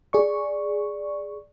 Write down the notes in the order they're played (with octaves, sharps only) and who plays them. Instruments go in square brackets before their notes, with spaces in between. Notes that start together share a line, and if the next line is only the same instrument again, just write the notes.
[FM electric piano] G#4 D5 C#6